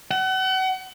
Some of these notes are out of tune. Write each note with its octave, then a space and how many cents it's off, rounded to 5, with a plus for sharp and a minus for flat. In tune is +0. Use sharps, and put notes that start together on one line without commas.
F#5 +35